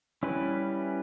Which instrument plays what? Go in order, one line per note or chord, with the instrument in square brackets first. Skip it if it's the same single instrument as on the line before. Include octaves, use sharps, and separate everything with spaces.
[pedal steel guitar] G3 C#4 E4 B4